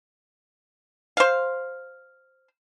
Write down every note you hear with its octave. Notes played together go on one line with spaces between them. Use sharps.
C5 F5